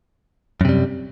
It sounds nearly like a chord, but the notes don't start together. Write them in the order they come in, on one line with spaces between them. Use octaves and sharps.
F#2 C3 G3